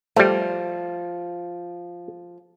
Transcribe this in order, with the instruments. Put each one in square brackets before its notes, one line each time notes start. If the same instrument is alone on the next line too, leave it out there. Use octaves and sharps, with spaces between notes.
[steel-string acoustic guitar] F3 [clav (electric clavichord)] G3 A3